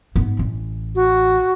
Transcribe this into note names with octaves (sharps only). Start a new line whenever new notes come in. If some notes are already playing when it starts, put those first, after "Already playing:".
G#2 B3
A1
F#4